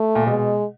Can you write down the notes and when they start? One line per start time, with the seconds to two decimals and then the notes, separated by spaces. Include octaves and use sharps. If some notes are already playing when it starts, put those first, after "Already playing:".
Already playing: A3
0.15 A#2
0.27 B2 G#3